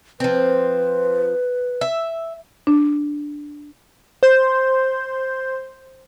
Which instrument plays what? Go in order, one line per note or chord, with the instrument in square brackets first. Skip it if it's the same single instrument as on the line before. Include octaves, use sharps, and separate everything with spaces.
[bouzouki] F3 C4 [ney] B4
[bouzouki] E5
[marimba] D4
[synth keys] C5 C6 G6